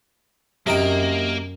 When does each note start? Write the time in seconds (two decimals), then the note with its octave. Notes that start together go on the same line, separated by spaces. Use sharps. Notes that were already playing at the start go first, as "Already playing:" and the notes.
0.67 F#2 C3 A#3 D#4 G5